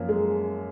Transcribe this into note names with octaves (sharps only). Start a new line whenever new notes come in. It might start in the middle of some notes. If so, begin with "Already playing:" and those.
Already playing: F#2 F3 A#3
G#3